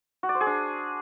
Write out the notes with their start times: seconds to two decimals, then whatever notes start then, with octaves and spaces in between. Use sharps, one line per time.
0.23 F#4
0.29 D5
0.35 C5
0.41 G#4
0.46 D4